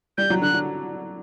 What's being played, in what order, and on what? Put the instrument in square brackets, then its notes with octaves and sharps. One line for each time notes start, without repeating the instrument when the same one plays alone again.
[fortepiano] G3 [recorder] G6
[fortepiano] F#3
[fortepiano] D3 [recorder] F#6
[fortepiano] D3